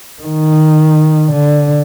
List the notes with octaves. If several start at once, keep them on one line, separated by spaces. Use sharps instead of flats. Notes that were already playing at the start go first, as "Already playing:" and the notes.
D#3
D3